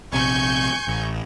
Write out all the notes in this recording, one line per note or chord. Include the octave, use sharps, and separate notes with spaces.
A#1 C3 G#5 C#6 G6
A1